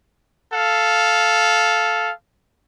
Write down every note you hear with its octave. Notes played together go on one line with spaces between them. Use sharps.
A4 F5